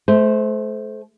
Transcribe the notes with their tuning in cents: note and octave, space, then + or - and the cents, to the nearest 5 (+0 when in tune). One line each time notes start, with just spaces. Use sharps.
A3 -35 C5 -10